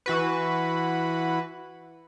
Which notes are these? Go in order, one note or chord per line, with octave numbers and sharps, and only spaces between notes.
E3 F#4 B4